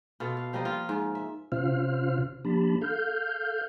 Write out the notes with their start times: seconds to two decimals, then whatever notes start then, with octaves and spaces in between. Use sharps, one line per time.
0.20 B2 F4 A4
0.37 F5
0.53 F3 G3 A#3 D#5
0.65 F4
0.89 G#2
1.15 E5
1.52 C3 C#4 F4 C5 F5 F6
2.45 F3 A#3 D4 G4 A5 B5
2.82 A4 F5 F6 G6